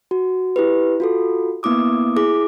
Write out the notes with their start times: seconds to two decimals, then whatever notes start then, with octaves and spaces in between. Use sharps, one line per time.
0.11 F#4
0.56 E4 G4 B4
1.00 F4 F#4 A4
1.63 A#3 B3 E4 D6 D#6
2.16 E4 G#4 D6